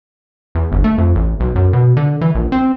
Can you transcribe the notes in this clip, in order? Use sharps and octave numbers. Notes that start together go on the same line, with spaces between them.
E2
G1
A3
F2
A1
B1
F#2
B2
D3
E3
A#1
C4